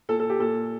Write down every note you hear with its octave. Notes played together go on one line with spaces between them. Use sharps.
A#2 A4
A4
G4
A#2 A4